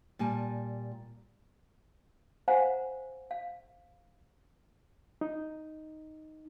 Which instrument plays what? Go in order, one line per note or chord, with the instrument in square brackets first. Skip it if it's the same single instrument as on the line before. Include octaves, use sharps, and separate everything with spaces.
[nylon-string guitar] A#2 G3 G#5 A5
[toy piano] C5 F5 F#5 G#5 A#5
F5
[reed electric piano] D#4